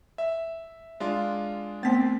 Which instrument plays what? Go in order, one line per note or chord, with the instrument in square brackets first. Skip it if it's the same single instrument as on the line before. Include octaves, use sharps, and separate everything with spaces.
[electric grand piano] E5
G#3 D4 F4
[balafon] A3 B3 [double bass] C4 [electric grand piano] A6 B6